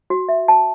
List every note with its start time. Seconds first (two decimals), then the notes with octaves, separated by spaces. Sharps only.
0.10 F#4
0.29 E5
0.48 A5